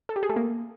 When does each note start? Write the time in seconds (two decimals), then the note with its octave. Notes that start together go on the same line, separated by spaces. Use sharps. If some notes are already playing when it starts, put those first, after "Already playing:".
0.09 A4
0.16 G4
0.23 G#4
0.29 A3
0.36 A#3